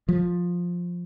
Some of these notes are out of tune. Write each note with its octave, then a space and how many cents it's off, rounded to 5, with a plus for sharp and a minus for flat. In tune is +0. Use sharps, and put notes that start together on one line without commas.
F3 +10